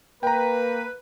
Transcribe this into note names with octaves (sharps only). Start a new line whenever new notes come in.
A#3 B4 G5 A#5